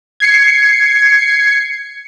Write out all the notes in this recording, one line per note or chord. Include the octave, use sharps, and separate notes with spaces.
G#6 C7 C#7